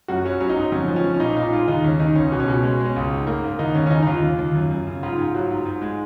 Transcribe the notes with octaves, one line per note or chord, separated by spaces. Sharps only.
F#2 F#4
F#3 C#4
F#3 C#4
D#4
G#2
F2 C#4
F3
C#4
F3
C#4
A#2 D#4
A#2 D#4
G#3 F4
D#2 D#4
D#2 C#4
D#3 D#4
C#2 C#4
B2
C#4
B2
G#3 C#4
G#3
C#4
C#2
G#2
A#3
G#2
D#2 D#4
D#2 C#4
C#4
C#3 D#4
D#4
D#2 F4
D#2
D#2
F#2
F#2
C#3
G#2 F4
G#2
F#3
G#2
G#2
G#3